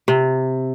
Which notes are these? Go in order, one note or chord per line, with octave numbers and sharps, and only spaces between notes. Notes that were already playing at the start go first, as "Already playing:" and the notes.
C3